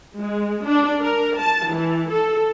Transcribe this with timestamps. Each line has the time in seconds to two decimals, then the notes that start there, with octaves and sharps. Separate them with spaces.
0.20 G#3
0.67 D4
1.02 A#4
1.40 A5
1.72 E3
2.11 A4